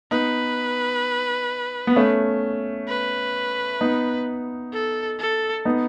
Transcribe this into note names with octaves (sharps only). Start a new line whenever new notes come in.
B3 D#4 B4
B3
A3 C#4
B4
B3 D#4
A4
A4
B3 D#4